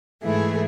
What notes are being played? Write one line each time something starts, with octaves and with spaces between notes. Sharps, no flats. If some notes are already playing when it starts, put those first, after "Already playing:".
G#2 E3 A3 E4 G#4